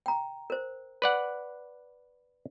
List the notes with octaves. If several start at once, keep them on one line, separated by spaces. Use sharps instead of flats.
G5 A#5
A#4 C5
B4 D5 F#5